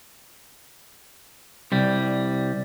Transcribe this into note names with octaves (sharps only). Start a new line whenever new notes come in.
C2 G3